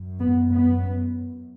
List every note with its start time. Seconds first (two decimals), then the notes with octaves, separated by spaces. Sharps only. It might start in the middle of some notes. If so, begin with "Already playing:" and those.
Already playing: F#2
0.19 B3
0.51 B3